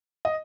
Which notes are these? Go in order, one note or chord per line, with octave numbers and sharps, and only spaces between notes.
D#5